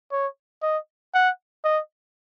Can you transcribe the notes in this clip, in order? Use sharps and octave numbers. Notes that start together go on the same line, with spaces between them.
C#5
D#5
F#5
D#5